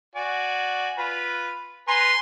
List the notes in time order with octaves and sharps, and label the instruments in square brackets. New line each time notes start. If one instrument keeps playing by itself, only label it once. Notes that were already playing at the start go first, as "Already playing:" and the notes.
[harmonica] F#4 D5 G#5
F4 B4 B5
[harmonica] B4 G#5 A#5 [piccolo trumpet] C6